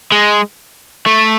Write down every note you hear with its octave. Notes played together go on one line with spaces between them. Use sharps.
G#3
A3